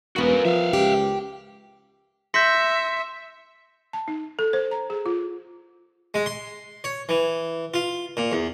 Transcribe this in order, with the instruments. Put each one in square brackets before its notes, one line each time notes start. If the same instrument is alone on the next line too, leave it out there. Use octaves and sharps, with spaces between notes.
[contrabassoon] E1 [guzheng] A#3 B3 [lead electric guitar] F#4 A#4
[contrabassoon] F3 [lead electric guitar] E5 F5
[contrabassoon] C#2 [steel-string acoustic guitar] G4
[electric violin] E5 [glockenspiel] C6 B6 C#7 [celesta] G6 A#6
[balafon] A5
D#4
A4
C5
A#5
G#4
F4
[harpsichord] G#3
C6
C#5
E3
F4
A#2
E2